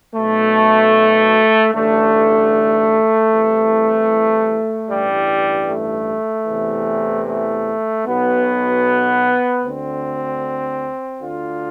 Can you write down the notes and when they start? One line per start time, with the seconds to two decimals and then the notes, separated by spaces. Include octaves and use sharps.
0.15 B1 B2 A3
1.73 A1 G2 D3 A3
3.31 C2 C3 E3
4.89 A1 G2 E3 G3
5.68 A3
6.47 E2 C3 E3
7.26 A3
8.05 B1 B2 B3
9.63 D2 D3 C4
11.22 D2 D3 F4